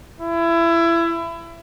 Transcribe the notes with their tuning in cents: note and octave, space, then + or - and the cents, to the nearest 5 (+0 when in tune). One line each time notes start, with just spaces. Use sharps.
E4 +25